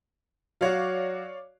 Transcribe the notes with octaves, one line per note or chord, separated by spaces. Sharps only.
F#3 F#4 C#5 D5 F5